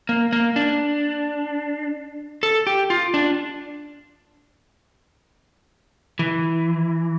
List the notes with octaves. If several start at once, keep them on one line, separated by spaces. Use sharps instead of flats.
A#3
A#3
D4
A4
G4
F4
D4
E3